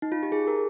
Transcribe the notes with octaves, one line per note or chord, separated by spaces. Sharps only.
D#4
F4
G4
G#4
A#4